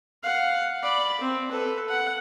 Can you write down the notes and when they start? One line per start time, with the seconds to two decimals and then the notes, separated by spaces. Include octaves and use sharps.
0.23 F5 F#5
0.82 D5 B5
1.21 C4
1.49 A4 B4
1.89 F#5